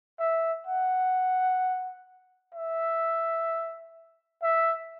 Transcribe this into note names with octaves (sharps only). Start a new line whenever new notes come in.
E5
F#5
E5
E5